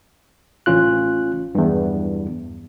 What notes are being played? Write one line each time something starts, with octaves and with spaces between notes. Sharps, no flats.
A1 C#4 F4 F#6
E2 G2